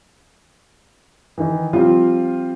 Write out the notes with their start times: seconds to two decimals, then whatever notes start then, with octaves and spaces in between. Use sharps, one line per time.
1.38 D#3 E3
1.73 F3 G3 C4 F4